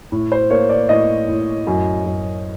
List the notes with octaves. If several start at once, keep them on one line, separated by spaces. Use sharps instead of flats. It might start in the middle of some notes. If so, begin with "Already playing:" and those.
A2
C5
A#3 C#5
D5
A2 D#5
A2
F#2
F#2